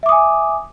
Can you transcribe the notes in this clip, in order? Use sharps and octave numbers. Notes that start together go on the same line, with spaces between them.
E5 G#5 D6 D#6